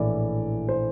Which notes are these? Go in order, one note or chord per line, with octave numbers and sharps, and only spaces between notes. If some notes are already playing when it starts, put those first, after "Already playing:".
Already playing: A#1 A2 E3 D5
C5